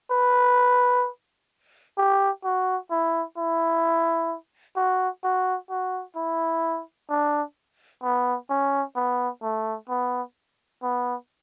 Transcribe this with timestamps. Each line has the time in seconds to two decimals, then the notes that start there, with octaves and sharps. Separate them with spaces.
0.11 B4
1.98 G4
2.44 F#4
2.90 E4
3.38 E4
4.76 F#4
5.24 F#4
5.70 F#4
6.16 E4
7.10 D4
8.03 B3
8.50 C#4
8.96 B3
9.43 A3
9.89 B3
10.82 B3